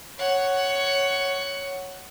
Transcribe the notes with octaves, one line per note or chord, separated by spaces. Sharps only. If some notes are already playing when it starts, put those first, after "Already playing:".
C#5 F#5